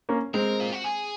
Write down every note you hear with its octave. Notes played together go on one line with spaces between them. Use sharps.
A#3 C#4
G#3 C4 A#4
F4
F#4
G#4